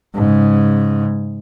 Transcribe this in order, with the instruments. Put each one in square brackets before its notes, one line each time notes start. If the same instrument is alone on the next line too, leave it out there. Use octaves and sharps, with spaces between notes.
[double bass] G#2 C#3